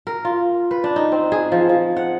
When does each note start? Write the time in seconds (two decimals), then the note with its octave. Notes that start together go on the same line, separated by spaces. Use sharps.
0.07 A#4
0.25 F4
0.71 B4
0.84 D4
0.96 D#4
1.12 C4
1.32 G#4
1.52 F3
1.69 F3
1.97 F#5